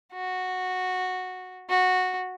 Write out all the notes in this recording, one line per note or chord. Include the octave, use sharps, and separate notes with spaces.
F#4
F#4